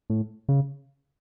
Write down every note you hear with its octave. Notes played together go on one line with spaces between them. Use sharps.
A2
C#3